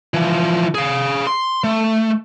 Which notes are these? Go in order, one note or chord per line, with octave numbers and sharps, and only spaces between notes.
E3 F3
G#4 F5
C6
A3